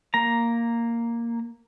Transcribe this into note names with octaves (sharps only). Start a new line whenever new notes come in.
A#3 A#5